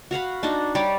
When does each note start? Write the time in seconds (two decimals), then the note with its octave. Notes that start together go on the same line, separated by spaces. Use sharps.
0.11 F#4 F5 F#5 B5
0.43 D4 D#4 F#4 F#5
0.75 G3 G4 C#5 D5